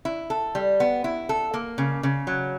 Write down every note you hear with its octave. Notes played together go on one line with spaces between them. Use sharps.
E4
A4
G3
B3
E4
A4
A#3
C#3
C#3
F#3